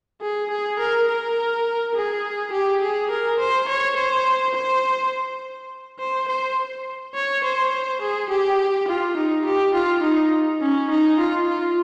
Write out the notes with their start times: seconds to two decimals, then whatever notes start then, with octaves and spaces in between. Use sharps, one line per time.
0.21 G#4
0.50 G#4
0.79 A#4
1.08 A#4
1.95 G#4
2.53 G4
2.81 G#4
3.10 A#4
3.39 C5
3.68 C#5
3.96 C5
4.54 C5
5.99 C5
6.28 C5
7.14 C#5
7.44 C5
8.01 G#4
8.30 G4
8.88 F4
9.16 D#4
9.45 G4
9.74 F4
10.03 D#4
10.61 C#4
10.90 D#4
11.19 F4
11.48 F4